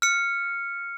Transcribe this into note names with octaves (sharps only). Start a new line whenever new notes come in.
F6 C#7